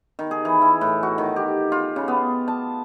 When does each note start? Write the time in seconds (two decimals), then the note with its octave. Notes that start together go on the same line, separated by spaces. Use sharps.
0.19 D#3
0.31 G#4
0.45 E3
0.62 E4
0.81 A2
1.03 F#4
1.18 D#3
1.36 G4
1.72 F4
1.96 C#3
2.08 B3
2.48 A5